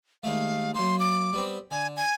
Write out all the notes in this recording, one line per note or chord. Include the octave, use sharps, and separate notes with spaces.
D#2 G#3 A3 F5
F#2 A#3 C6
D6
G3 B3 C4
D3 G#5
G#5